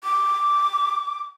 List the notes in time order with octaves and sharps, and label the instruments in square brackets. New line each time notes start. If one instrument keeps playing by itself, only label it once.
[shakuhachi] D6